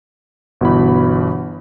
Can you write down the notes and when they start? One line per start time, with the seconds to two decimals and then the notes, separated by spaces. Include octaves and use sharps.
0.61 G1 B2 E3 B5